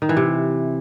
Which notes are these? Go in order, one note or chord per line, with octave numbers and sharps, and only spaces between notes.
D#3
E3
C3